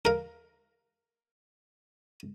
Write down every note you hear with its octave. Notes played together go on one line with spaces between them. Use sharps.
A#4 F5